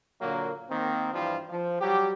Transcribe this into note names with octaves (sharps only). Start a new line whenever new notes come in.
A#2 D3 F#3 A#3
D#3 A#3 C4
G2 E3 F3 G3 F4
F3
F#3 G3 G4